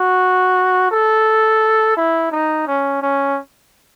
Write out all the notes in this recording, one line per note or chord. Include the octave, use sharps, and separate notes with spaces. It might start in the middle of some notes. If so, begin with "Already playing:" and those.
Already playing: F#4
A4
E4
D#4
C#4
C#4